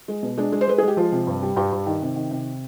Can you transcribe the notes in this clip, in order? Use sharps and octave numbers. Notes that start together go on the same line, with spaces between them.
G#3
B2
G#3 D4
G#3
C5
G#3 B4
G#4
G#3 G4
F3 F4
C3
G2
G3
G2 G4
G2
D#3
C3
D#3
C3